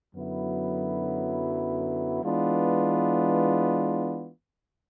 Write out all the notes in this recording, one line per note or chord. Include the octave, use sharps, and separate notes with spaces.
F#2 D3 F#3 B3 E4
E3 G#3 B3 D4 F4